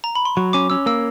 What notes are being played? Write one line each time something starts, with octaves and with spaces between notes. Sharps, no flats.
A#5
B5
C6
F#3 C#6
C#4 D6
C#4 E6
A#3 E6